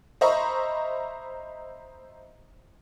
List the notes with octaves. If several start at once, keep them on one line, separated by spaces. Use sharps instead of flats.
C5 D#5 E5 A#5 B5 C#6